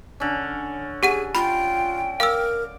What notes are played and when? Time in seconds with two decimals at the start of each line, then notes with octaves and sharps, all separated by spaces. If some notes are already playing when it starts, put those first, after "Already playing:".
0.20 D3 C#4
1.03 G4 G#4 F#5 D#7
1.35 F4 G5 B5
2.20 A#4 F5 D6 E6